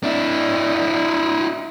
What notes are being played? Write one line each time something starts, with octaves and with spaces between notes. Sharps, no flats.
D4 E4